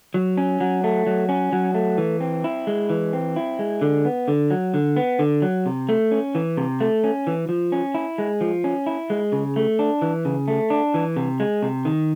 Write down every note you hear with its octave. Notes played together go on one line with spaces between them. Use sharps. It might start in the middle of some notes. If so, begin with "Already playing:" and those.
F#3
C#4
F#3
A3
F#3
C#4
F#3
A3
E3
C4
E4
G#3
E3
C4
E4
G#3
D3
B3
D3
F#3
D3
B3
D3
F#3
C3
A3
C#4
E3
C3
A3
C#4
E3
F3
C#4
E4
G#3
F3
C#4
E4
G#3
C#3
A3
D4
E3
C#3
A3
D4
E3
C3
G#3
C3
D#3